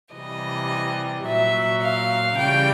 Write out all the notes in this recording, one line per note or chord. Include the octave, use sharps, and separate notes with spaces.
C3 E3 G3 D#5
A#2 F#3 E5
F5
C#3 E3 G3 G5